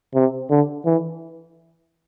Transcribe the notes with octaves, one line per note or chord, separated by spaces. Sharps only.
C3
D3
E3